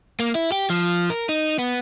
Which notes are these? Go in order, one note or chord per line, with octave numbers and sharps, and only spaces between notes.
A#3
E4
G4
F3
A#4
D#4
B3